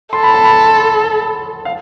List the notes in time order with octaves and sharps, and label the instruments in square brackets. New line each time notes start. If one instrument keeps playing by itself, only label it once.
[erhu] A4 [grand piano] C6
[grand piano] B5
A5
B5
F5